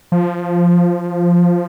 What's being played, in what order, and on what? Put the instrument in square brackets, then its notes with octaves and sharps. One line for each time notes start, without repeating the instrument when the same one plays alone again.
[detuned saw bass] F3